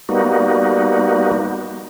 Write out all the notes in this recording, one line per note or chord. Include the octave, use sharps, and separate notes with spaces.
G3 A#3 B3 D#4 F#4